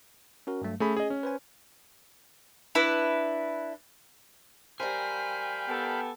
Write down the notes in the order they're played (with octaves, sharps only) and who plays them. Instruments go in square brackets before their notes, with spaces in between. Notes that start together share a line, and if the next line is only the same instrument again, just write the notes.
[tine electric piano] C#4 F#4 A#4
G2 F#3 A3
[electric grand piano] A3 G#4 B5 [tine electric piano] C#4
[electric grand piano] G#4 D#5
C#4
[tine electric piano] B4 C5 G#5
[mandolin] D4 E4 B4
[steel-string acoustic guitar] G3 A#4 C5 [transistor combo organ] F5 G5 B5 [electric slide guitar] G#5
[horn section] B3 G4 A4